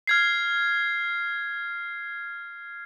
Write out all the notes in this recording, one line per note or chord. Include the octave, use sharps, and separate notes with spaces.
F6 G#6 C7